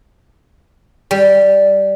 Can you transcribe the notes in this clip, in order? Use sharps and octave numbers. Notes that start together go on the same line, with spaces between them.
G3